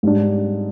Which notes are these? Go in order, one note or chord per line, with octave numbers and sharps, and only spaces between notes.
G#2 G3 D4